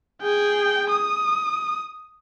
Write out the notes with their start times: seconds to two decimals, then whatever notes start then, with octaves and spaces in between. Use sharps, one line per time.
0.22 G#4 G5
0.90 D#6